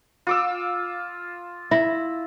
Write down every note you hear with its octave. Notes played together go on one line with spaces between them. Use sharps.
F4 D6 E6
E4 E5